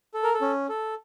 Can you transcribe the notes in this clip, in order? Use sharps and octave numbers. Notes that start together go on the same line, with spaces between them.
A4
A#4
A4
C#4
A4